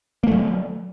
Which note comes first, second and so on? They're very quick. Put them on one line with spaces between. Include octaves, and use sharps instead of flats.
A#3 A3 F#3